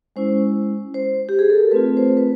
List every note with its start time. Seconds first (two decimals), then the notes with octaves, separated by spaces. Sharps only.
0.16 G#3 C#4 E4 C5
0.94 C5
1.29 G4
1.39 G#4
1.50 A4
1.60 A#4
1.71 A3 C4 F4 B4
1.97 C5
2.17 B4